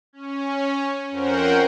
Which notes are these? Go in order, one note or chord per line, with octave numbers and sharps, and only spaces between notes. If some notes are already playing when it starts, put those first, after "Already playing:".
C#4
F2 C#4 A#4 C5 F#5 G5